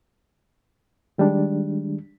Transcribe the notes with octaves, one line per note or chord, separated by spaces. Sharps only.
D#3 G3 G#3 D4